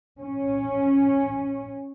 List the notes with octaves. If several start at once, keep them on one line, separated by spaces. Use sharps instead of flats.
C#4